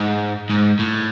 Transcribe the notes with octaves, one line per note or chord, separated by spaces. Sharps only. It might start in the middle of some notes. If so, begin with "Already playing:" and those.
Already playing: G#2
G#2
A2